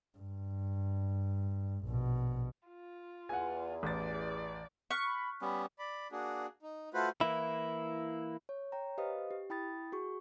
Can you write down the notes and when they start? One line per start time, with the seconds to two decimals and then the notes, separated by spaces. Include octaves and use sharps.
0.18 G2
1.85 A#1 B2
2.68 F4
3.29 E2 F#5 G#5
3.83 A1 D5 A6
4.91 C#6 F6 F#6 B6
5.03 B5
5.41 G3 B3 C#4 B5
5.79 D5 B5
6.12 A#3 D4 F#4 G#4
6.63 D#4
6.94 A3 F4 F#4 B4 C5
7.21 E3 A#3 E4
8.49 C#5
8.72 C#5 G5 A#5
8.98 G4 B4 C5 D#5 F5 D#6
9.31 G4
9.50 E4 G5 B5 D#6 A6
9.92 F#4 G#4 C#6